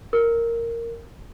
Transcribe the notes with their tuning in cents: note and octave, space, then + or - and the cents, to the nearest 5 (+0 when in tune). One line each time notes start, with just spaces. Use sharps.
A#4 -10